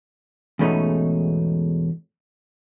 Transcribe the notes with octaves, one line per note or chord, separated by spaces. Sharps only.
E2 G#2 B2 A3 C#4 D#4